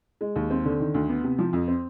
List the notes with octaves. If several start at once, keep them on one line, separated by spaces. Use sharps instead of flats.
G#3
D#2
C4
D3
D#3
D2
B3
C3
F3
F2
C4